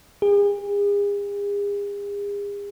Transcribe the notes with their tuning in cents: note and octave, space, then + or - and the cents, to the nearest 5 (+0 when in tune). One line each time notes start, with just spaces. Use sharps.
G#4 -40